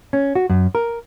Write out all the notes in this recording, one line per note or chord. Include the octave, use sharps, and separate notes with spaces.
C#4
F#4
F#2
A#4